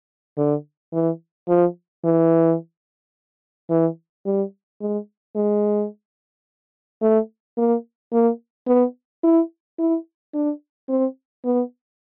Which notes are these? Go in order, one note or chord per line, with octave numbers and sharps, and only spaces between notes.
D3
E3
F3
E3
E3
G3
G#3
G#3
A3
A#3
A#3
B3
E4
E4
D4
C4
B3